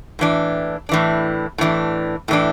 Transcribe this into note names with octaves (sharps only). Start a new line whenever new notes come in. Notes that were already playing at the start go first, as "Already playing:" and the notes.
A2 E3 D4
A2 E3 D4
A2 E3 D4
A2 E3 D4